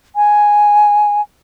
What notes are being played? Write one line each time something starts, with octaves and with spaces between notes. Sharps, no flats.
G#5